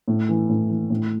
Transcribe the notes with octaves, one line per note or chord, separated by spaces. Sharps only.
A2
E3
A2
E3
A2